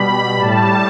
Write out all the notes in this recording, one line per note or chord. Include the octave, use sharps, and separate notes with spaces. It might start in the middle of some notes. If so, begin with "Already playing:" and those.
Already playing: B2 G3 B5
A2 G3 A5